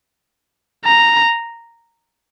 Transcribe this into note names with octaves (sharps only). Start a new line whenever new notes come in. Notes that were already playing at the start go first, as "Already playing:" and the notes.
A#5